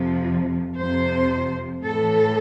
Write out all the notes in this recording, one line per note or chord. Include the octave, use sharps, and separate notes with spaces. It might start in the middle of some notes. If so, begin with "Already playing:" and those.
Already playing: F2 C3 F3
F2 C3 F3 C5
A2 E3 A4